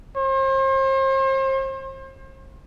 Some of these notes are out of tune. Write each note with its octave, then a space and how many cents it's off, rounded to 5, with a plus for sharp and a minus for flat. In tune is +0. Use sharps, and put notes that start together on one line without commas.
C5 +40